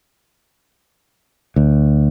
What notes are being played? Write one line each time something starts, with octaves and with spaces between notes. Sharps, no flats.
D2